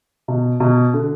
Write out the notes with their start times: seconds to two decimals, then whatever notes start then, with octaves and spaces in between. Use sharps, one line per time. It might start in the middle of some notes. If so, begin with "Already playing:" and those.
0.28 B2
0.60 B2
0.94 D3